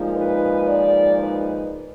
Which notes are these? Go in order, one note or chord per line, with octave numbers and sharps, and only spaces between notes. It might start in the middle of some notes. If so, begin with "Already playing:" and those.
Already playing: A#2 F3 G#3 D#4
B4
D5
B4